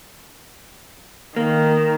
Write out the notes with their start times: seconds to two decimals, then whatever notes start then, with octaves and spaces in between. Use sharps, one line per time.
1.36 D#3 A#3